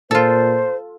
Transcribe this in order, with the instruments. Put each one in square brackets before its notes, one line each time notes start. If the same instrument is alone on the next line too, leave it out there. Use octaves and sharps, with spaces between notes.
[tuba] A#2 [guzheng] F4 A4 [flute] C5